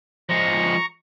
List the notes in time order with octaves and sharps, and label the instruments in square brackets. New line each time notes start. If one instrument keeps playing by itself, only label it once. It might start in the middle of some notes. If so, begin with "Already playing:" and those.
[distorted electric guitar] F3 G#3 [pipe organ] A#5 C#6